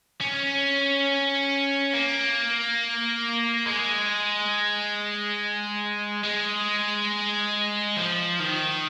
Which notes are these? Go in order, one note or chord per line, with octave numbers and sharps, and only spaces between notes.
C#4
A#3
G#3
G#3
F3
D#3